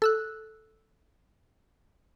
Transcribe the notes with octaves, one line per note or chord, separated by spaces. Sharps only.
A4 E6 F#6